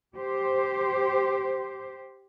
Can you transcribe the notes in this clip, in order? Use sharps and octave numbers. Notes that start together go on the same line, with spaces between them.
G4 C5